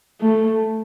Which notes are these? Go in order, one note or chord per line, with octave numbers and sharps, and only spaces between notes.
A3